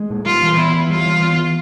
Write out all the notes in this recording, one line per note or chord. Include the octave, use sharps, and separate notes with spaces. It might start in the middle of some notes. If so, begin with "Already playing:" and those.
Already playing: G#3
A#2
G3 F4
E3
B3 E4
E3
G3 F4
E3
B3
E3